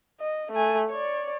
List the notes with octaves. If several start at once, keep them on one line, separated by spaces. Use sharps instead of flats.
D#5
A3 G#5
C#5 D5